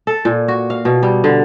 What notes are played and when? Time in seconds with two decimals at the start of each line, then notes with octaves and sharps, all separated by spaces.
0.07 A4
0.25 A#2
0.48 F#4
0.70 F5
0.85 B2
1.03 G3
1.24 D3